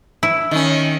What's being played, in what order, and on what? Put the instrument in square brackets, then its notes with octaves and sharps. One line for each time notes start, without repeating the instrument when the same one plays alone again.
[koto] E4
[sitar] D#3 C#4